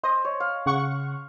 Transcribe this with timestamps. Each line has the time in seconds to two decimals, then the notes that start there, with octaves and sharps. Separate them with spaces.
0.03 C5 D#5
0.25 C#5
0.40 F5
0.66 C#3 F#5 C#6